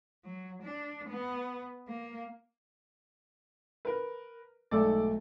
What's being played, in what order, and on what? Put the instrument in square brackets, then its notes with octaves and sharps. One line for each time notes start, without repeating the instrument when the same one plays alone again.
[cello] F#3
D4
B3
A#3
[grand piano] A#4 B4
[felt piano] B1 G#2 A3 [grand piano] A4 D5